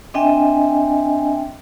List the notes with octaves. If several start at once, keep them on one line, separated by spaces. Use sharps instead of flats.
C4 D4 D#5 E5 G5 G#5